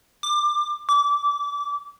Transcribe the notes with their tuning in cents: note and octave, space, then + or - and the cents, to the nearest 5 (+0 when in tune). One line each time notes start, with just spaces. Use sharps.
D6 +20
D6 -20